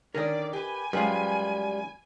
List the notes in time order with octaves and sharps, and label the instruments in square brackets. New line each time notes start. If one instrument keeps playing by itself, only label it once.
[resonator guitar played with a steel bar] D3 D#3 C#4 [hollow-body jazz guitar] A#4 D#5 [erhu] D5
[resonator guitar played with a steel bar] G4 B4 [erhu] G#5
[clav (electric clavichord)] F#2 F4 [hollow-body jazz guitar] G3 G#3 [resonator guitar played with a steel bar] B4